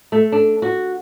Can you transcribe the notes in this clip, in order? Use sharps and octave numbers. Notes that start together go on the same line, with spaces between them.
A3
D4
F#4